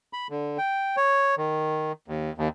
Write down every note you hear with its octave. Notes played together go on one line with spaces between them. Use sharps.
B5
D3
G5
C#5
D#3
D#2
D#2